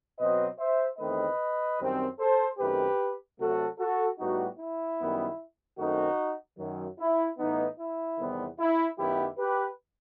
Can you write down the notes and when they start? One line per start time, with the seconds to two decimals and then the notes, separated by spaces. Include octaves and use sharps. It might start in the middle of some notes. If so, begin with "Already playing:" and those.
0.19 B2 F#3 C4 B4 D#5
0.59 C5 E5
0.99 E2 D#3 A3 C4 B4 D#5
1.79 F#2 D#3 G3 C4
2.18 A4 C5
2.58 F#2 D#3 A3 C4 G4 B4
3.38 C3 F#3 A3 F#4 A4
3.79 F#4 A4
4.18 A2 G3 B3 D#4 F#4
4.59 E4
4.99 F#2 D#3 G3 B3
5.78 F#2 D#3 A3 C4 D#4 F#4
6.58 F#2 D#3 F#3
6.99 E4
7.38 A2 E3 B3 D#4
7.78 E4
8.18 E2 C3 D#3 G3 B3
8.59 E4
8.98 F#2 D#3 F#3 B3 E4 G4
9.38 G4 B4